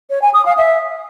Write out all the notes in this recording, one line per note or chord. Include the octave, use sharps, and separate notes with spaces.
C#5
G#5
D#6
F5
E5